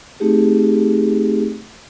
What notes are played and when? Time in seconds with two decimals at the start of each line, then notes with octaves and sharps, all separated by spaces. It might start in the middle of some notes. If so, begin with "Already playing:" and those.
0.20 A3 C4 D#4 G4 G#4